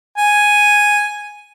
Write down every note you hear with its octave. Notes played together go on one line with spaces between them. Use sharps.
G#5